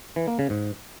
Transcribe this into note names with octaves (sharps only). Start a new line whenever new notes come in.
E3
A#3
C#3
G#2